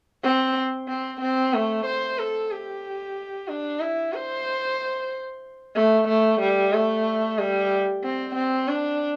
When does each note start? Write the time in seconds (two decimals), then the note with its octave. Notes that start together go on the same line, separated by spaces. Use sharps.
0.23 C4
0.88 C4
1.21 C4
1.54 A3
1.86 C5
2.18 A4
2.51 G4
3.48 D4
3.80 E4
4.14 C5
5.76 A3
6.08 A3
6.41 G3
6.73 A3
7.38 G3
8.03 C4
8.35 C4
8.68 D4